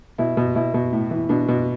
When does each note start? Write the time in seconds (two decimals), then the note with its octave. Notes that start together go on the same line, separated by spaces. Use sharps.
0.18 B2 E4
0.37 B2
0.55 B2 E4
0.74 B2
0.92 A2
1.11 E3
1.29 B2 D4
1.48 B2